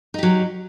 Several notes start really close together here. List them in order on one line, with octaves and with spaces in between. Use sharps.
D#4 G4 F#3